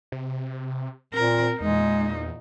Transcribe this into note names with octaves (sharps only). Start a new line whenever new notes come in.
C3
A#2 C4 A#4
E2 A#2 G#3 D#4